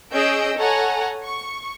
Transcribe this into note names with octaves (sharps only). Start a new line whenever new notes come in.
C#4 G#4 D#5 E6 G6 D7
A4 C#5 F#5 G#5 A#5
C#6